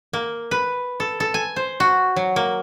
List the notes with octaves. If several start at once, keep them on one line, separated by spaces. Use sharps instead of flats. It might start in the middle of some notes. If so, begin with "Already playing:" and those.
A#3
B4
A4
A4
G#5
C5
F#4
F#3
A#3